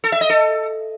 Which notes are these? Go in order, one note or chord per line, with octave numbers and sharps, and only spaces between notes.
A4
E5
D#5
A4